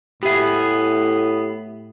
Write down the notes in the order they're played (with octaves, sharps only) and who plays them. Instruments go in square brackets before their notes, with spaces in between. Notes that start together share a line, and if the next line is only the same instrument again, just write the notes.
[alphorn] A2 [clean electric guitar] B3 G#4 [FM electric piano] G4 E5